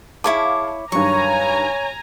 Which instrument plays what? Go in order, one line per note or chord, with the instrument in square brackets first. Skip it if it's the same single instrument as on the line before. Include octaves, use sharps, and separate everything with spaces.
[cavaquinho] E4 C#5 D6 [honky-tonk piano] G#4 F5 A5
[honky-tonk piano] G2 D#3 F#3 [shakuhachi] C#5 [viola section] G#5 A#5 [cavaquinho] C#6